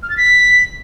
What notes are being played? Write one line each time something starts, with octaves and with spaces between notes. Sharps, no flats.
F6
A6
B6